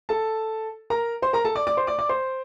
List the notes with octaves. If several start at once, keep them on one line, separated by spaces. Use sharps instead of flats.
A4 A5
A#4 A#5
C5 C6
A#4 A#5
A4 A5
D5 D6
D5 D6
C5 C6
D5 D6
D5 D6
C5 C6